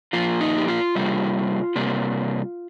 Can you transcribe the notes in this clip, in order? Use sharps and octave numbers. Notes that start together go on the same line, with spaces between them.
A#2 F3 A#3 F4
D#4
G4
F4
C3 G3 A#3
C3 G3 A#3